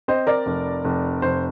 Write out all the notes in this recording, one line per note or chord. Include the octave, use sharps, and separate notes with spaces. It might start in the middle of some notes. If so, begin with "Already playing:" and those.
C4 C5 D#5
A#4 D5
F1
F1
F1 C5